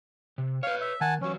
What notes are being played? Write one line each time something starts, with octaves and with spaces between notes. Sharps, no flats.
C3
B4 C#5 F5
E5
D#3 F#5 G#5 A5
E3 F#3 C#4